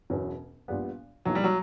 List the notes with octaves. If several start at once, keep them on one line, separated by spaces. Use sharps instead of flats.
E1 E2 B2 F#3 C#4
A#1 A#2 G3 B3
B1 B2 F#3 A#3 E4
G3
F#3